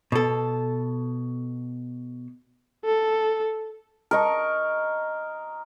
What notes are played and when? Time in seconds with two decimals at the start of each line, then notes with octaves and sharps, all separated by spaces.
0.12 B2 A4
2.85 A4
4.11 A#4 D#5 C#6